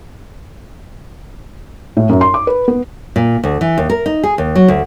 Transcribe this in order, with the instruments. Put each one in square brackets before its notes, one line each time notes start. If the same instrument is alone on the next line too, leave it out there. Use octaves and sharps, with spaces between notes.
[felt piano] A2
F#2
C6
D6
B4
B3
[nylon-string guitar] A#2
D2
E3
D#2
A#4
D#4
G#4
D#2
F#3
D2